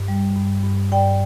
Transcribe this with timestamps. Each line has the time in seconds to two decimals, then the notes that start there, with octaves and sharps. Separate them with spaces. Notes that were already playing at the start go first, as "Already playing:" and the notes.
Already playing: G2
0.08 G3
0.35 G2
0.64 G2
0.91 G2 D5 G5